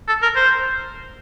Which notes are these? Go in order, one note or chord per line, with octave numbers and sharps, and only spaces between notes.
A4
A#4
C5